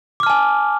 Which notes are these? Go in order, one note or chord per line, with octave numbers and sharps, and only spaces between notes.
G#5 A5 D6 F6